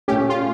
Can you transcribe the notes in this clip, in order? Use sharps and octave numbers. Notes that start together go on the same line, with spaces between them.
A#2 A3 C#4 G4
F4